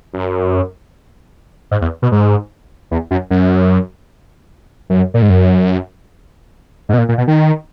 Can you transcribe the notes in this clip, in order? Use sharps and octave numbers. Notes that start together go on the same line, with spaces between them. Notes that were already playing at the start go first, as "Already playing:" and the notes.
F#2
G#2
E2
B2
G#2
E2
F#2
F#2
F#2
A#2
G#2
F#2
G#2
B2
A#2
A#2
B2
D#3